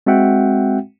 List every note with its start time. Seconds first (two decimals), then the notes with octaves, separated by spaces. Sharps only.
0.07 G#3 C4 F#4 E5 F#5 G5